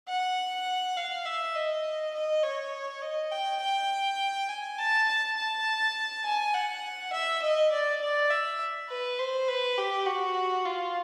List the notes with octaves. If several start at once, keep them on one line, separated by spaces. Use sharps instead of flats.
F#5
F5
E5
D#5
D#5
C#5
D#5
G5
G5
G#5
A5
A5
A5
G#5
F#5
E5
D#5
D5
D5
E5
B4
C5
B4
G4
F#4
F4